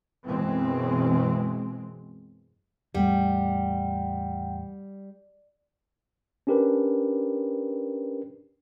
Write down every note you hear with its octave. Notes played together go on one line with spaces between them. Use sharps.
F#2 B2 E3 G#3 C4
E2 A2 G3 A3 F#5 G5
C#4 D4 G4 A#4 B4